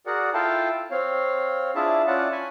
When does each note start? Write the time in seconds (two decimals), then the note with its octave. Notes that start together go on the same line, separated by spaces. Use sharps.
0.06 F#4 G#4 A#4 D5 F#5
0.34 E4 F4 A4 F5 G5 A5
0.91 C4 C#5 F5
1.75 D4 E4 F4 G#4 E5 A5
2.07 C#4 E4 F4 D5 F#5 A5
2.32 G#5 B5 C#6